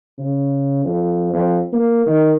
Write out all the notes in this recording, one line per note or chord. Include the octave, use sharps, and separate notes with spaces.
C#3
F2
F2
A#3
D#3